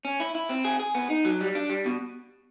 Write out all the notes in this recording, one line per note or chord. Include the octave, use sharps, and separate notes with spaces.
C#4
E4
E4
C4
G#4
G#4
B3
D#4
F#3
G3
D4
G3
B2